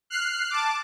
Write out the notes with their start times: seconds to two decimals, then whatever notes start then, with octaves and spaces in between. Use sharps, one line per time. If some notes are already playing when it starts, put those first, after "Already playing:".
0.10 F6 F#6 C7
0.50 A5 D6